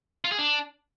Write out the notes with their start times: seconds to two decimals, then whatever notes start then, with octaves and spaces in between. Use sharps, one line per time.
0.25 F4
0.32 G#4
0.39 D4